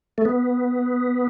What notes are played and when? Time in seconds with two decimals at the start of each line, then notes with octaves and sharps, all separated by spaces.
0.18 A3
0.25 B3